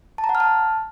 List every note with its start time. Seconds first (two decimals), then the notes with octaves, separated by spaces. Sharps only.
0.18 A5
0.24 A#5
0.29 F#5
0.35 F6
0.40 A5